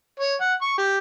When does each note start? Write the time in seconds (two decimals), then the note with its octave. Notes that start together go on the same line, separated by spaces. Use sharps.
0.19 C#5
0.41 F#5
0.62 C#6
0.78 G4